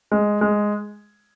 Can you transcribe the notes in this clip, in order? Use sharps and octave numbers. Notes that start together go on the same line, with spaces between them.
G#3
G#3